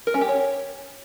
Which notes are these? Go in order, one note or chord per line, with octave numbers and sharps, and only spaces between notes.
A#4
C#4
G4
C#5